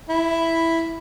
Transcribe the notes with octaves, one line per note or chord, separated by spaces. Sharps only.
E4